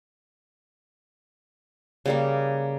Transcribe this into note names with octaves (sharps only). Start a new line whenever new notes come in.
C#3 G3 A#3